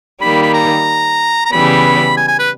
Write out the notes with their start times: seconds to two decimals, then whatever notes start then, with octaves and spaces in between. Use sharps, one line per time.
0.21 D#3 G3 A#3 B5
0.43 B5
0.54 A#5
1.45 A#5
1.52 C#3 E3 G3 B3 B5
2.17 G#5
2.28 G#5
2.39 B4